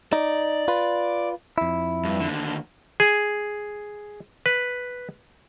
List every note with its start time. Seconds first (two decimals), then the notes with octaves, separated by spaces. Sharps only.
0.13 D#4 D5
0.68 F4 B4
1.58 F2 E4
2.05 G2
2.21 D#2 D3
3.00 G#4
4.46 B4